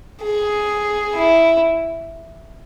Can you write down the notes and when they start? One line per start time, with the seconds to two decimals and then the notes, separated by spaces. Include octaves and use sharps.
0.23 G#4
1.16 E4